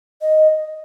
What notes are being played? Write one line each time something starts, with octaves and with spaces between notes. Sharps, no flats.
D#5